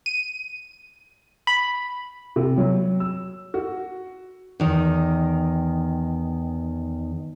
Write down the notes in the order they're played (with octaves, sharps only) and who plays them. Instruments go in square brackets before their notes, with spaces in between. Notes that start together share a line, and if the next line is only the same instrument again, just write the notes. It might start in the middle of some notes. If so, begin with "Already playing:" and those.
[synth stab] D#7
B5
[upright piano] C3
F#3
E6
F#4
[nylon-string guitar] E2 D#3